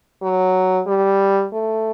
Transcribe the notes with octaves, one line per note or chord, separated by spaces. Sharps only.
F#3
G3
A3